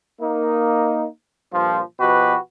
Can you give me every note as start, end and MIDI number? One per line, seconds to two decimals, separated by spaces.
0.20 1.07 58
0.20 1.07 63
1.53 1.81 43
1.53 1.81 46
1.53 1.81 53
2.00 2.36 47
2.00 2.36 53
2.00 2.36 66
2.00 2.36 67
2.00 2.36 71